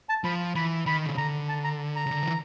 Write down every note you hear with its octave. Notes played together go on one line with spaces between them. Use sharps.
A5
F3 B5
E3 B5
D#3 B5
C#3
D3 A#5
A5
A#5
A#5
C#3
D3
E3